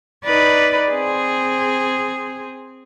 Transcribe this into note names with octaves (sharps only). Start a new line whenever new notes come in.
D#4 B4 D5
C4 G#4